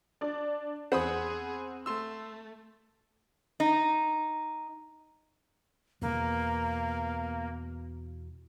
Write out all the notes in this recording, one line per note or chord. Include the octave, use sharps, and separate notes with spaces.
D4 D5
E2 C4 G#4 C5 F#5 B5 D#6
A3 C6 E6
D#4
E2 B2 A#3